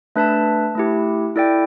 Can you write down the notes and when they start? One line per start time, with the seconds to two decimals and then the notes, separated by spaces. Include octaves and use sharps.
0.16 A3 D4 B4 E5 A5
0.75 A3 E4 G4
1.36 E4 A4 D5 G5